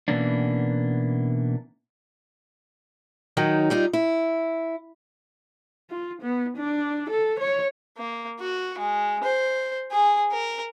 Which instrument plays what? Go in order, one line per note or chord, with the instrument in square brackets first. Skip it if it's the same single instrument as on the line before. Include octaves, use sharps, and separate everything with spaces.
[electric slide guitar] B2 E3 A#3 B3 C#4 D4
[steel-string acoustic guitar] D#3 F#3 D#4
G3 D#4 F4
E4
[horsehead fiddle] F4
B3
D4
A4
C#5
[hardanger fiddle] A#3
F#4
G#3
C5
G#4
A#4